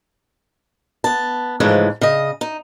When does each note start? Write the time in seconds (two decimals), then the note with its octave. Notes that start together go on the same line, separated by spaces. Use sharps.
1.04 B3 A5
1.60 G#2 C#3 E3 F3 G#3 A3
2.01 C#3 D#5
2.41 D#4